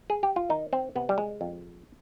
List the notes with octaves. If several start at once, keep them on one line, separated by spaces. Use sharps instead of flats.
G#4
G4
F4
D#3 D#4
C4
C3 B3
G3
G#3
F2